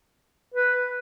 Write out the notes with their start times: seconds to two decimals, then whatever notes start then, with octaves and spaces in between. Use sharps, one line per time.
0.54 B4